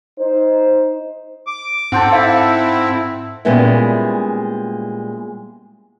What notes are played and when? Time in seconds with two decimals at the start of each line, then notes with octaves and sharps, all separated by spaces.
0.19 D#4 C5
1.47 D6
1.92 G#2 C4 A4 C5 F#5
2.13 E4 F5
3.45 A#2 G3 G#3 B3 C#4 E4